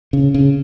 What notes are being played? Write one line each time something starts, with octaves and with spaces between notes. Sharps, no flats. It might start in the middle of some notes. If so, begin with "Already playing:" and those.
C#3
C#3